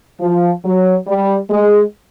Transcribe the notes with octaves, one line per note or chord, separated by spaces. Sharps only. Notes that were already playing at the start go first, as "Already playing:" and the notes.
F3
F#3
G3
G#3